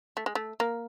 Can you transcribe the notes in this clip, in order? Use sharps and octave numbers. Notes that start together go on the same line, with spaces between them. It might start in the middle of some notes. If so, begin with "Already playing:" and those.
A3
G#3
A3
A#3